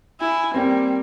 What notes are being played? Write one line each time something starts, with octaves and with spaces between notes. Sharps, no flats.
E4 G#5
G3 A#3 C4